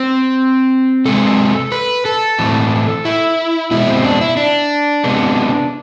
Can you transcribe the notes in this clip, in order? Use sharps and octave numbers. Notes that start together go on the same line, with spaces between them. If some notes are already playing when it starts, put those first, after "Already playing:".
Already playing: C4
C3 G#3 C4 A4
B4
A4
A2 E3 A3 C4
E4
B2 G#3 B3 E4
C4
D4
E4
D4
C3 G#3 B3